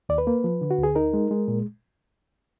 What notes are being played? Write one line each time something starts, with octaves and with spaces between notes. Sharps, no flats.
D#2 D5
B4
A#3
F3
D3
F#4
D2
G#4
D#4 A#4
G#3
G#3
A#2